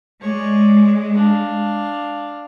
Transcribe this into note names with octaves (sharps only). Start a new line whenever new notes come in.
G#3 C#5 D5
D4 F5